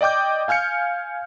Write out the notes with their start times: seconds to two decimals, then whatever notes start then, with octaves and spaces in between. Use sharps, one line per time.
0.01 D5 D#5 G5 D6 G6
0.48 F5 G#5 F6 G6 C#7